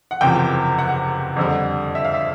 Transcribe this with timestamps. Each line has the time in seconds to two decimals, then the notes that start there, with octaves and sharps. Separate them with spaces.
0.11 F#5
0.21 F#1 E2 C3 F3 G5
0.78 F#5
1.36 F2 D3 G3
1.95 E5
2.05 F5
2.14 E5